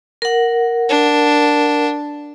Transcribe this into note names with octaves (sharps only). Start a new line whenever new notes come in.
A#4 F#5
D4